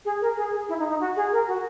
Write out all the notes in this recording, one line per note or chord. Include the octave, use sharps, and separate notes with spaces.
G#4
A#4
G#4
G#4
E4
D#4
D#4
F#4
G#4
A#4
F#4